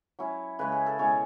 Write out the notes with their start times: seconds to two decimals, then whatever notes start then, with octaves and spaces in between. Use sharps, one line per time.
0.19 F#3 C#4 E4
0.59 C#3 G#3 C#4 B4
0.72 G#4
0.86 A4
0.99 B2 G#3 C#4 E4 C#5